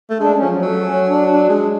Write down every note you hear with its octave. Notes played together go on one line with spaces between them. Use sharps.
A3
G#3 D4
C#4
F3
F#3
F#3 A3
C#4
D4
D4
G#3